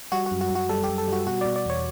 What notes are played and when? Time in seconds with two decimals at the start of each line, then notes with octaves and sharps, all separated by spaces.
0.12 G3 F#4
0.26 F#4
0.31 F#2
0.41 F#4
0.50 F#2
0.55 F#4
0.69 G3 A4
0.84 F#2 G4
0.98 A4
1.08 G3 F#4
1.27 B2 F#4
1.41 B2 D5
1.56 D5
1.65 E2 C#5